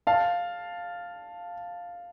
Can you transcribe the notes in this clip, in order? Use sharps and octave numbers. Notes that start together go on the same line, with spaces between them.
F5 A5